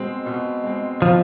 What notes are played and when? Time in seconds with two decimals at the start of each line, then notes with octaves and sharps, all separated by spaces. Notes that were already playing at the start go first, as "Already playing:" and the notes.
Already playing: B2 G#3 C4
0.26 B2
0.64 G#3 C4
1.01 B2 F3